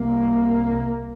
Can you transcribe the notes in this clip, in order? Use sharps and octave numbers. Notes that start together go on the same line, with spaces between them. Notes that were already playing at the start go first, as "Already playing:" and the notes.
Already playing: C2 C3 A#3